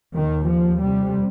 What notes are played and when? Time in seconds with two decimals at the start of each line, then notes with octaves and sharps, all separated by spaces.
0.15 D#2 D#3
0.48 F3
0.81 F2 C3 G3